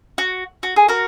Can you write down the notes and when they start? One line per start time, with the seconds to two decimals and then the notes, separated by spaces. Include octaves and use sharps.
0.18 F#4
0.63 F#4
0.76 G#4
0.88 F#4 A#4